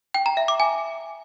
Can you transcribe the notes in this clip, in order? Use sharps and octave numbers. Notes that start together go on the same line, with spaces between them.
G5
A#5
E5
D6
G#5